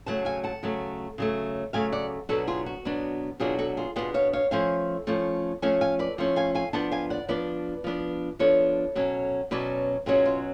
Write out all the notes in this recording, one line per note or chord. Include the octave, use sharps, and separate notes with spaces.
C#3 F#3 A3 F#5 A5
F5 G#5
F#5 A5
C#3 F#3 A3
C#3 F#3 A3
C#3 F#3 A3 F5 G#5
D5 F#5
B2 F#3 B3 D4 F#4 A4
F4 G#4
F#4
B2 F#3 B3 D4
B2 F#3 B3 D4 F4 G#4
F#4 A4
F4 G#4
B2 F#3 B3 D4 F4 G#4
C#5 F5
C#5 F5
F3 A3 C#4 F5 G#5
F3 A3 C#4
F3 A3 C#4 F5 G#5
F5 G#5
B4 D5
F3 A3 C#4
F5 G#5
F5 G#5
F3 B3 D4 F#5 A5
F5 G#5
D5 F#5
F3 B3 D4 B4 D5
F3 B3 D4
F3 B3 D4 A4 C#5
B2 F#3 C#4
B2 F#3 C#4 B4 D5
B2 F#3 C#4 F4 G#4
F4